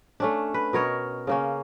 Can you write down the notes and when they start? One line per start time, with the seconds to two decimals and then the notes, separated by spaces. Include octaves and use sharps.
0.20 A3 C#4 D4
0.54 B4
0.73 B2 A#4 C#5 D#5
1.27 C#3 A#3 C#4